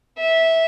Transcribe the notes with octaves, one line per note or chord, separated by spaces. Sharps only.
E5